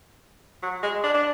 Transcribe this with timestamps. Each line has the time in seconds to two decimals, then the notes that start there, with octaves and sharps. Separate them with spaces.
0.63 F#3
0.83 G#3
1.04 D4
1.14 D4